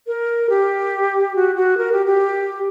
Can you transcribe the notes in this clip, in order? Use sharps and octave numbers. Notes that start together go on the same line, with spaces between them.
A#4
G4
F#4
F#4
A#4
G4
G4